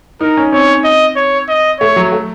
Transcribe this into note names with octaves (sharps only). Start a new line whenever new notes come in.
D#4 A#4
C#4
C4 C#5
D#5
C#5
D#5
A3 C#5
F#3
A3